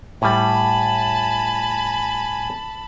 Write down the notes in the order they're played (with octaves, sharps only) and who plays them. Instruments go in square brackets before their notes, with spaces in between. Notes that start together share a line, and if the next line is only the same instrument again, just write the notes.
[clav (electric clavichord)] A2 G3 [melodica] G#5 [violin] A5 B5